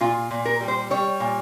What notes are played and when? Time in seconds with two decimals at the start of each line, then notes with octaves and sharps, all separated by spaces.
0.01 A#2 F4
0.31 A#2
0.45 A#4
0.61 G3
0.68 C5
0.90 G3 C#5
1.20 A#2